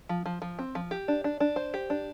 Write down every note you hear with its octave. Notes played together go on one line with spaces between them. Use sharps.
F3
F3
F3
C4
F3
G4
D4
D4
D4
C5
G4
D4